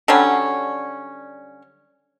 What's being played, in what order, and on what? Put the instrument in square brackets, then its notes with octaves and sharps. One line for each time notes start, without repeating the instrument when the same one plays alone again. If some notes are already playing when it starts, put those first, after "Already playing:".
[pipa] D3 F#3 G3 C#4